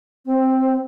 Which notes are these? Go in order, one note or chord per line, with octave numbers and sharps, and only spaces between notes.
C4